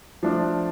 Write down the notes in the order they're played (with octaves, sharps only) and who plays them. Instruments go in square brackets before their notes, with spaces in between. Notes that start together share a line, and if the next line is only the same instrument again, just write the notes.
[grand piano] F3 A3 D4